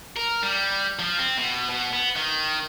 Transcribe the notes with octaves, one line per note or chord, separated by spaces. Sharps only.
A#4
G3
F3
C4
B2
B2
B3
D#3